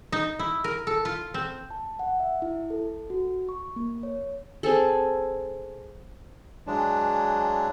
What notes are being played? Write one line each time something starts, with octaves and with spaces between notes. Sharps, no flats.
D#4
E4
A#4
A4
F4
C4
A5
F#5
E5
E4
A4
F#4
C#6
A#3
C#5
C4 G#4 A4
E3 F#3 G#3 D4